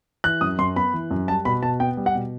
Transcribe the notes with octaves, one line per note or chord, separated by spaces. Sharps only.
E3 F#6
F#2 D#6
F#2 C6
B3 B5
E3
F#2
G3 A5
B2 B5
B2 A5
B3 G5
G3
F#5
B2